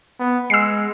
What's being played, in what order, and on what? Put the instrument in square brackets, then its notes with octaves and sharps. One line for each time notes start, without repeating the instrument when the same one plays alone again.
[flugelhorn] B3
[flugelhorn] G#3 [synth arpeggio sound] E6 C7